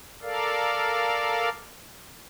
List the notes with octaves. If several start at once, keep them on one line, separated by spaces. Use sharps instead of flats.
A4 A#4 D5 F5